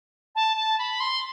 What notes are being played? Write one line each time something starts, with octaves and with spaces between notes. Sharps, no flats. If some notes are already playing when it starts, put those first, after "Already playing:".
A5
A5
B5
C6